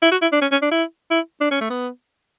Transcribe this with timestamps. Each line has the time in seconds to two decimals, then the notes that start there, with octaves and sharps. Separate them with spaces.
0.02 E4
0.11 F#4
0.22 E4
0.32 D4
0.41 C#4
0.51 C#4
0.62 D4
0.71 E4
1.10 E4
1.41 D4
1.51 C#4
1.61 A3
1.70 B3